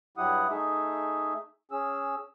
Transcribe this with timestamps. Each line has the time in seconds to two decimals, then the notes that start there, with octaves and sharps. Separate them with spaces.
0.18 G2 F#3 E4 G4 F#5 D#6
0.50 A3 D#4 G#4 E5
1.72 C#4 G#4 E6